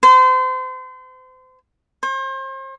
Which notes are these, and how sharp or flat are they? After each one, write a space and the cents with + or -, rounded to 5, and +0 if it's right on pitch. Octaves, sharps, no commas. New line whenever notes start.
C5 -35
C5 +40